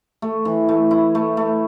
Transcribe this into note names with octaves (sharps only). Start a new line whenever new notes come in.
A3
E3
A3
E4
A3
A3